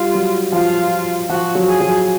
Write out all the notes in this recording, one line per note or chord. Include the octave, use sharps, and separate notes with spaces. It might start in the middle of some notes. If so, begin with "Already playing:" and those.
Already playing: G3 F4
F#3
F3 F4
F3 F#4
F#3
G#4
F#3